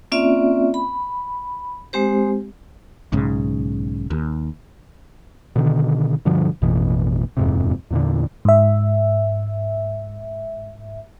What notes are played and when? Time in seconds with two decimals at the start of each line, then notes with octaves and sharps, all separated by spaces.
0.12 A#3 C4 C#4 F4 D5 E5
0.74 B5
1.93 G#3 C4 G4 C5
3.12 B1 G#2 C#3
4.10 D#2
5.56 B2 D3 D#3
6.25 G2 B2 D3 F3
6.62 A1 F2 B2 E3
7.37 D#1 F2 G#2 C3
7.91 E2 A#2 D3
8.45 G#2 E5